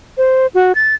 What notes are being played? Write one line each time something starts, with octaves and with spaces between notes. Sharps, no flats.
C5
F#4
A6